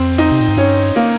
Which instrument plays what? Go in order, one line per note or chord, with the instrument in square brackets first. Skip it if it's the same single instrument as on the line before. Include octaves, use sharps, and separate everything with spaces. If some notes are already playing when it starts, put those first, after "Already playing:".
Already playing: [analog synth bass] F2 [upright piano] C4
[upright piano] D#4
[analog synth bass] C3
A#2
G#2
[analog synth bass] G2 [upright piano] C#4
[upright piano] A#3